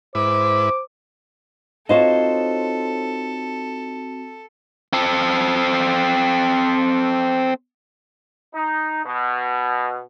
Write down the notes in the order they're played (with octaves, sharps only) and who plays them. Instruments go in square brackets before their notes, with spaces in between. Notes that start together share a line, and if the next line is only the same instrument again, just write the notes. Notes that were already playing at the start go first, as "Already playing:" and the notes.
[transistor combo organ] G#2 E4 B4 [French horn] C5 [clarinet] D6
[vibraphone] C4 F#4 [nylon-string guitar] D#4 F4 C#5 [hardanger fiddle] A4 [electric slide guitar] C5 D#5
[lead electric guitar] C4 A4
[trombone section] D#4
B2